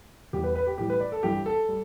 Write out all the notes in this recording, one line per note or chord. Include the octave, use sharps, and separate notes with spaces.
E2 E3 G3 G4
B4
B4
G4
A2 E3 G3 G4
B4
D5
A4
G2 E3 G3 G4
A4
G3